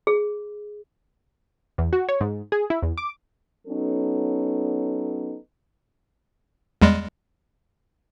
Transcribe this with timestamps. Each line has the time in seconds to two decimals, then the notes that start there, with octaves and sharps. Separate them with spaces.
0.07 G#4
1.78 E2
1.93 F#4
2.09 C#5
2.20 G#2
2.52 G#4
2.70 E4
2.83 E2
2.98 D6
3.67 F#3 B3 C#4 D#4 A4
6.82 E2 G3 G#3